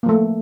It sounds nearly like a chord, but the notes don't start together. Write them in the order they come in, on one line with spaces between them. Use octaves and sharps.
A#3 F3 A3